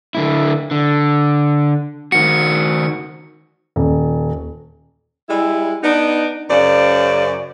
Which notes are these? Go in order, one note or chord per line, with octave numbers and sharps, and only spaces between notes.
D3 E4
D3
D#3 F#4 C#7
D#1
G3 G#3 E4
B3 D4 D#4
F#2 C#3 C5 D5